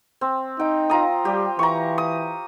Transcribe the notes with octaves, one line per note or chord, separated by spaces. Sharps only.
C4
D#4 G5
F4 A#5 D#6
G3 G4
E3 A#5 C#6
D#6